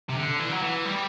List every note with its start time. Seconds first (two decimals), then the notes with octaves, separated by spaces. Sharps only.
0.09 C3
0.16 D3
0.39 E3
0.52 F#3
0.63 E3
0.86 G3